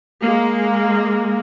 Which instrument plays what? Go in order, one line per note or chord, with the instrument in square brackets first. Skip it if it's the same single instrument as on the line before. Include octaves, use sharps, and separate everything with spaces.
[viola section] G#3 A#3